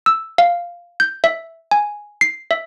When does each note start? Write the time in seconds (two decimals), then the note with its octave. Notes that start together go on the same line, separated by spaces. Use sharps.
0.06 E6
0.38 F5
1.00 G6
1.24 E5
1.71 G#5
2.21 C7
2.51 E5